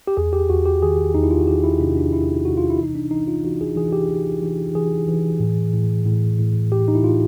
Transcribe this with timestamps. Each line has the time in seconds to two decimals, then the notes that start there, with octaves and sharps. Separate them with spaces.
0.07 G4
0.17 E2 G#4
0.33 G4
0.50 E2 F#4
0.65 G4
0.82 D#3 G#4
1.15 E2 D#4
1.23 E4
1.31 F4
1.40 F#4
1.47 D#3 G4
1.64 E4
1.80 C3 D4
1.97 D4
2.13 E2 E4
2.45 C3 F#4
2.58 F4
2.70 E4
2.79 E3 D#4
2.95 D4
3.11 E3 D#4
3.28 F4
3.44 E3 F#4
3.61 G#4
3.76 E3 G#4
3.93 G4
4.10 E3
4.42 E3
4.75 E3 G#4
5.08 E3
5.40 A2
5.73 A2
6.06 A2
6.39 A2
6.72 A2 G4
6.88 D#4
6.95 E4
7.03 A2 F4